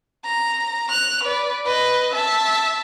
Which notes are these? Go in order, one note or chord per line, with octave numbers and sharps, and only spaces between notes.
A#5
F#6 F7
B4 D5
B4 D#5
E5 A5